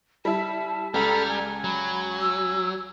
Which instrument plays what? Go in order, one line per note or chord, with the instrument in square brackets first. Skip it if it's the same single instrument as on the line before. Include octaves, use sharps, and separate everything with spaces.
[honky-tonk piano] G3 E4 [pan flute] A5
[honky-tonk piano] C#2 [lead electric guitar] G3 [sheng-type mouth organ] A4 B5 F6 [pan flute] A#5
[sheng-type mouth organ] G#5
[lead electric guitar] F#3 [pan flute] B5
[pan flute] E6